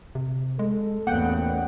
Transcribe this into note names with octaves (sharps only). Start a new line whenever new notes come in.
C3
G#3 A4
A1 E2 A#3 F#5 G5